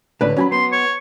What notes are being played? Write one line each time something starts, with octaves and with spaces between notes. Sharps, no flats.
C#2 A2 D3 B4 D5
F#3 C#4 G#5 B5
B3 C6
C#5